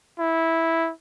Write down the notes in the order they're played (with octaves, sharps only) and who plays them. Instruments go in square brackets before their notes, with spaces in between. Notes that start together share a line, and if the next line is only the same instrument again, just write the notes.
[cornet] E4